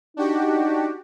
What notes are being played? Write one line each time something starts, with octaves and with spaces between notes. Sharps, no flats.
D4 D#4 F#4 G4